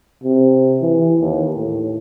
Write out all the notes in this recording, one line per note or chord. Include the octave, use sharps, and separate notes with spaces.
C3
E3
D#2
A2